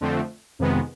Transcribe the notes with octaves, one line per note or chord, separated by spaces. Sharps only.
F2 D3 F3 A3 C4
F2 C3 D#3 G#3 B3